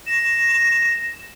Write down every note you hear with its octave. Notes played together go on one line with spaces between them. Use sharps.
A#6 E7